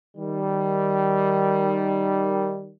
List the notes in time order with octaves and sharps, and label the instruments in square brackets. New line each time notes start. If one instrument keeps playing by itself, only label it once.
[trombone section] D#3 G3